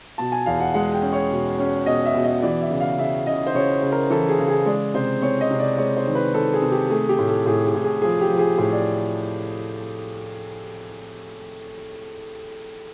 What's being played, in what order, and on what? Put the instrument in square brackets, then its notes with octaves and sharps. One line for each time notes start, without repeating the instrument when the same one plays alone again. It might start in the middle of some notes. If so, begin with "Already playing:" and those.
[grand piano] B2 A5
G#5
E2 F5
F#5
G#3 F#5
G5
C#4
C#5
B2
C#4
B2 D#5
E5
B2
D#5
E3 D5
E5
C#3
F5
C#3 E5
C#3 D#5
C5
C#3 C#5
C#3
A#4
E3 A4
G#4
C#3
G#4
G#3 D5
C3 C5
C4 C#5
D#5
C3
D5
G#3 C#5
C5
D#3
B4
D#3 A4
G#4
C3
G4
A3 G#4
G4
A2
A4
A2 G#4
G#4
A2
G#4
F3 G#4
G4
F3
G#4
A2 G#4
D5